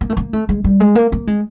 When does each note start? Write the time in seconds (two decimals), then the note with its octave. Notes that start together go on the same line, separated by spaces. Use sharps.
0.01 A#3
0.10 A3
0.17 A#3
0.33 A3
0.49 G#3
0.64 G3
0.80 G#3
0.95 A#3
1.12 A#3
1.27 G#3